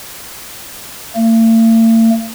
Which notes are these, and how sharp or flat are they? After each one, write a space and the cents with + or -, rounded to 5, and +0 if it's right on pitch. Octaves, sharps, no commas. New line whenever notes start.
A3 +45